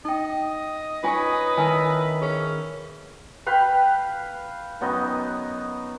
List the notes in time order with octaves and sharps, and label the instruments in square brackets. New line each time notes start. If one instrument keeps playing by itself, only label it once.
[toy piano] D#4 G5 [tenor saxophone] D#5
[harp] C#4 D#4 C#5 [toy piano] F4 G#5 [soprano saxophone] B4
[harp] D#3 A#4 E5 [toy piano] E4 G#5 A5
[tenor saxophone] C#4 [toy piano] G#4
[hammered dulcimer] B4 F5 G5 B5
F#2 B3 D#4 D#5